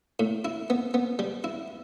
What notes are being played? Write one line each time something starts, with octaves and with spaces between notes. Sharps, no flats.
A2
E4
B3
B3
G3
E4